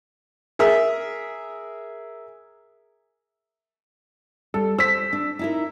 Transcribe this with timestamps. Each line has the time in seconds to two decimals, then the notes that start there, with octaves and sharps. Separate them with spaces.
0.59 G#4 A#4 E5
4.54 G3 A4
4.79 C5 E6 B6
5.13 D4
5.39 D#4 E4 A#4